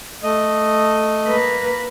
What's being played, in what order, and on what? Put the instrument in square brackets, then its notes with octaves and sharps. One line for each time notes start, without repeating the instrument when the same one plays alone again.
[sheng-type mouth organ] A3 D#5
[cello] A#3 B4